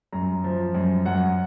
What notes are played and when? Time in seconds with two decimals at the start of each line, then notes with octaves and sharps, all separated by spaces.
0.12 F#2 A#5
0.44 F3
0.75 F#2
1.06 F#2 F#5